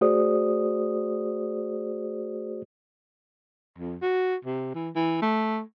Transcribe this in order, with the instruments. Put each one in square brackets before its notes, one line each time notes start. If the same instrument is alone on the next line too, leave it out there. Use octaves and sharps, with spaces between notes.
[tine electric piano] A3 F#4 G#4 C5 D5 D#6
[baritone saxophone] F2
F#4
C3
E3
E3
A3